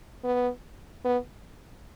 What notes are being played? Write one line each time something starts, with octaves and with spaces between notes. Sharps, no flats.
B3
B3